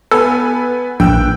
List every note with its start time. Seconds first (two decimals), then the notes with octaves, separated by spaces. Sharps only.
0.11 B3 A4 B4 G#5
1.00 A#1 G5 E6 F#6